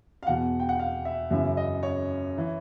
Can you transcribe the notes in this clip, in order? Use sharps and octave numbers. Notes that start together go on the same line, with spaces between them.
F5
E2 B2 F#5
G5
F#5
F5
E5
F#2 C#3 E3 E5
D#5
C#5
E3